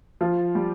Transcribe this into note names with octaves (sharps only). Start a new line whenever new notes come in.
F3 F4
G3 G4